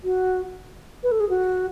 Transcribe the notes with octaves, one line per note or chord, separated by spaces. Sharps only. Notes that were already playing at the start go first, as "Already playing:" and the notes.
F#4
B4
A4
G#4
F#4